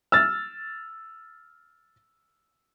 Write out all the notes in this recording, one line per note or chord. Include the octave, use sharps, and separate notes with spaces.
E6 F6 A6